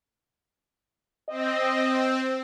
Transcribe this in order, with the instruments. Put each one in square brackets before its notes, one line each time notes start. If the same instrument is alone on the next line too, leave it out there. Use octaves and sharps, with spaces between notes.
[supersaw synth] C4 [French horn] D#5